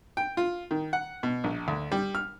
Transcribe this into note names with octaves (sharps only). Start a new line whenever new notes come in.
G5
F4
D#3
F#5
B2
A#1
D2
G3
F6